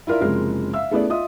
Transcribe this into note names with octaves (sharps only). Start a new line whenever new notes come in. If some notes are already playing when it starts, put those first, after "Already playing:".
E4 F4 A#4 D5 E5
F#1 C3 F3 G#3 C#4 A#4
E5 F5 E6
A3 B3 C#4 E4 G#4 D5
F4 D#5 E5 D#6